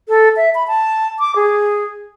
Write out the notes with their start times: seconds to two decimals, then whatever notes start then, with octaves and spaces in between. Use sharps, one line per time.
0.09 A4
0.37 E5
0.55 B5
0.68 A5
1.19 D6
1.36 G#4